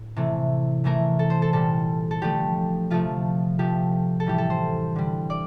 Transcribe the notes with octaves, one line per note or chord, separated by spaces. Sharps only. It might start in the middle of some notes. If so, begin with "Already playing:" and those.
Already playing: A2
C3 E3 A3
C3 E3 A3 A#4
A4
C5
A4
A#2 G3 A4
A4
D3 F3 A3 G4
C3 F3 A3 F4
C3 F3 A3 G4
A4
A2 E3 G3 G4
A4
C5
D3 G3
D5